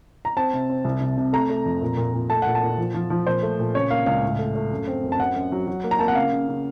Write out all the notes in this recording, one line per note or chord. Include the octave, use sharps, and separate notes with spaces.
A#5
C4 A5
C3
C4
C2
C3
C3
A3 A#5
A3
F2
A#2
A#2
A#2
A3 A5
A#2 F#5
A5
A#2
F3
F3
F3
A#2 C5
A3
A#2
C#3 C#5
A#3 F5
C#2 F5
A2
A3
A3
F#2
C4
F#2
A5
F#2 F#5
F#2
F#3
F#3
A#3
A#5
A#3 A5
F#5
C#3 F5
C#3
C#3